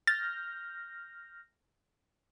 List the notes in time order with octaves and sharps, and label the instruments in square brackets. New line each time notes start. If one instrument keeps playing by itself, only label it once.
[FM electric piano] F6 G6 A#6 [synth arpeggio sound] A6